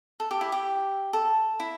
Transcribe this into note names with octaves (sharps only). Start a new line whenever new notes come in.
A4
G4
E4
G4
A4
E4